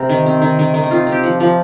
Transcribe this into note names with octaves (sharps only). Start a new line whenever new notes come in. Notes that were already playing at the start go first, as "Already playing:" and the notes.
Already playing: C3 C4 A#4
D#3
C4
D#3
D#3
D#3
D#4
C4 F4
C4
G4
F3
F3